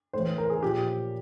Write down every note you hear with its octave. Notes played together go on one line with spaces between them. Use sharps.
A2 E3 C5
A#4
G#4
A#2 F3 G4